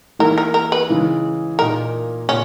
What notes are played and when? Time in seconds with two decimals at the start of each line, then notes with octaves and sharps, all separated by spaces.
0.19 E3 A#3 E4 A#4
0.38 A#4
0.54 A#4
0.72 B4
0.89 C#3 E3 G#3
1.59 A#2 A#3 D#4 A#4
2.29 A#2 C#4